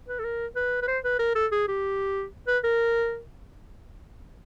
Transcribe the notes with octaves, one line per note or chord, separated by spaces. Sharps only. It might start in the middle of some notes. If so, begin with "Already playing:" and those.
B4
A4
A#4
B4
B4
C5
B4
A#4
A4
G#4
G4
B4
A#4